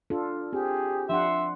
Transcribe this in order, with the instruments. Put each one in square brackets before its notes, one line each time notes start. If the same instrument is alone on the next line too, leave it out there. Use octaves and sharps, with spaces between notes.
[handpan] D4 F4 A4
[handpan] C4 [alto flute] G4 [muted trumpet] G#4
[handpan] F3 D4 F#5 [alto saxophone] E5 [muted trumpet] C6